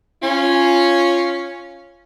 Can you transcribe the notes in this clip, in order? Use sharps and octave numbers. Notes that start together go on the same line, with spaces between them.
C#4 F4